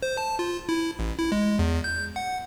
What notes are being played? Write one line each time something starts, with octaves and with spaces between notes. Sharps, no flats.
C5
A5
F4
E4
A1
E4
G#3
E2
G6
F#5